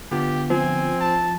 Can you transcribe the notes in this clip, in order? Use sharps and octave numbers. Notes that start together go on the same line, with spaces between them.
D3 B3 F4 G4
F3 C4 G#5
A5